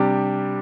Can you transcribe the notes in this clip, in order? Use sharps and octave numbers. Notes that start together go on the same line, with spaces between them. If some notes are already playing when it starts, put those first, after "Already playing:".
Already playing: C3 G3 D4 G4